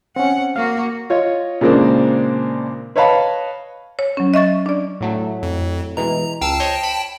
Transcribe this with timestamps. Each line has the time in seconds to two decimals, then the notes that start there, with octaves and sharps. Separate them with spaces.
0.16 C4 C#4 F#5
0.56 A#3 F#4 F5
1.10 F4 C#5 D#5
1.61 A#2 C#3 G#3 A#3 C4 D4
2.96 B4 C#5 D#5 F5 A5 B5
3.99 C#5
4.17 F#3 C#4
4.34 D#5 E5 C#6 A6
4.66 D4 D5
5.01 A2 F#3 A3
5.43 F2
5.97 B2 E3 G#3 A#5
6.41 C#2 F5 G5 A5 E6
6.60 C5 C#5 D#5
6.83 B5